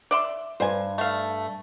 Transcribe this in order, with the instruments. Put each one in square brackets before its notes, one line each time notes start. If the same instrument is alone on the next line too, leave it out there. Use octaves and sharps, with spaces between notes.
[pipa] D5 E5 C6
[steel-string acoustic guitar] G2 [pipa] C5 G#5
[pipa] A3 F5